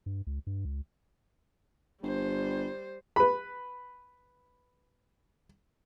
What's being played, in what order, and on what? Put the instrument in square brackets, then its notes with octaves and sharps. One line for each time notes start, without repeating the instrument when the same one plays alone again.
[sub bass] G2
C#2
G2
C#2
[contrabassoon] G1 [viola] G3 C5
[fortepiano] B4 B5